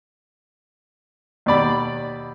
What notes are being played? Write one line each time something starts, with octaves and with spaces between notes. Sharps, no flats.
D#2 B2 D5 B5